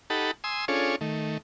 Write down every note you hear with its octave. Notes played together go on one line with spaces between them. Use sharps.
D#4 G4 A4 F#5 A5 B5
G#5 C6 D#6 E6
C#4 D4 F4 G#4 A4 C#5
D#3 A3